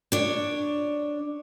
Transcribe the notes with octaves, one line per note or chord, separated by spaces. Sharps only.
D4 C#5